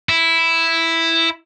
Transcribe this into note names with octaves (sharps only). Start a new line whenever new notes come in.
E4